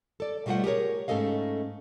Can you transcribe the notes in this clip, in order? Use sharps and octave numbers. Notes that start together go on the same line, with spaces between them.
A4 D5
B2 G3 A3 F4 C5 F#5
G4 G#4 A#4 C#5
G#2 A3 C#4 A4 D#5 F5